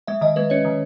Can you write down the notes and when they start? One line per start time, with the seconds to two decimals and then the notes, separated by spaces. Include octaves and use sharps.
0.07 G#3 E5
0.21 D#3 D#5
0.36 G#3 B4
0.50 C#4 C#5
0.65 D#3